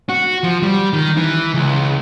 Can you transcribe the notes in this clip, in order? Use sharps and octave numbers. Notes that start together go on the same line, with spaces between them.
F#4
F3
G3
D#3
E3
C#2